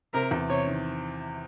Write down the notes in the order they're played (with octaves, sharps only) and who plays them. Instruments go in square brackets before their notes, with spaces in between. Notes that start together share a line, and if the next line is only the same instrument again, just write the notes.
[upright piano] C3 [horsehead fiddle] A#4
[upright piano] E2
[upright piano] C3 [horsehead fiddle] C#5
[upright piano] D#3